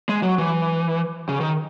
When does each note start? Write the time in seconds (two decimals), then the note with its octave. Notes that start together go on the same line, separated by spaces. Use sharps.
0.09 G#3
0.23 F#3
0.38 E3
1.29 C#3
1.40 D#3